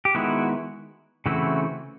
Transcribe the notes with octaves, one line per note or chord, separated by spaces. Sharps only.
G4
D#3 G#3 B3 E4 F#4
C#3 E3 A3 C4 E4 F#4